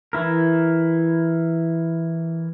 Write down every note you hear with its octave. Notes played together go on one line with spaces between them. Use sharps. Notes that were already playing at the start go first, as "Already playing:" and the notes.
E3 E4 A#4